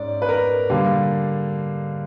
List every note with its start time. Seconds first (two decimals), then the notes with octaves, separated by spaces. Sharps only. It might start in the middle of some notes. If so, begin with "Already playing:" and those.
Already playing: G#2 C#4 D5
0.22 B4
0.29 A#4
0.70 D3 G3 A#3